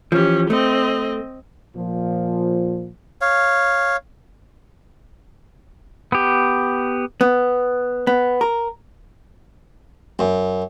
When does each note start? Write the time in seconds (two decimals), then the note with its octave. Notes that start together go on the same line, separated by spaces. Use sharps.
0.12 E3 F3 C#4 G4
0.50 A3 C4 D#5
1.76 A#2 F3
3.21 C#5 F5
6.12 B3 G4
7.21 B3
8.07 B3
8.41 A#4
10.19 F#2